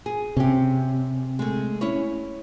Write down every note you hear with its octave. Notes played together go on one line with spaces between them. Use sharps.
G#4
C3 C#4 G4
G#3 A3
C#4 E4 C#5